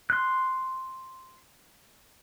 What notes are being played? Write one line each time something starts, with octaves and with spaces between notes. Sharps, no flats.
C6 F#6